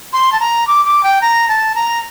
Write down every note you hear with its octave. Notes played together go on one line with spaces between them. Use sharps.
C6
A5
A#5
D6
D6
G5
A#5
A5
A#5